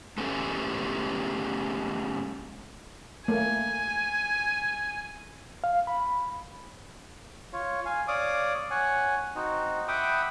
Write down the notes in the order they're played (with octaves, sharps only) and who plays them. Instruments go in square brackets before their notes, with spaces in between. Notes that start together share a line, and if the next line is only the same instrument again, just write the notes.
[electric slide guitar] G#3 A3 B3 C#4 G4 A4
[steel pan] A3 A#3 [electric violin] G#5
[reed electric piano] F5
B5
[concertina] F4 C#5
F5 G#5
C#5 D5 F5 D6 D#6
C#5 F#5 G#5
C4 D#4 F#4
E5 F#5 G5 B5 D6 D#6